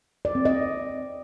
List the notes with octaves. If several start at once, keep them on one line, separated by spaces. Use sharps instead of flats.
D5
C4
D#5